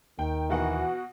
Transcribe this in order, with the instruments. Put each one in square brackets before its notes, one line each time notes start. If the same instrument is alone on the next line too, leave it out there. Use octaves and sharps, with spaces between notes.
[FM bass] D#2 [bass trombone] D#3 [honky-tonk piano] G5
[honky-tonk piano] B2 F#4 F#5 [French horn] E3